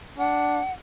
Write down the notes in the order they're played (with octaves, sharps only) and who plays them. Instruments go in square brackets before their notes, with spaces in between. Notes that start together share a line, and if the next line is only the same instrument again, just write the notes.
[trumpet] D4 [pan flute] F#5